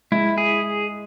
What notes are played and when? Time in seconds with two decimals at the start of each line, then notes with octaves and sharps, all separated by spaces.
0.12 G#3 E4
0.38 G#4